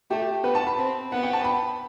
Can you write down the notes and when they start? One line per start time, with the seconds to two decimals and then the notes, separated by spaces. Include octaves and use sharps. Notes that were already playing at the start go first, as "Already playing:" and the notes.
0.10 A3 G4
0.44 B3 B4
0.55 A5
0.67 B5
0.78 C4
1.12 B3 F#5
1.23 G5
1.33 A5
1.44 B5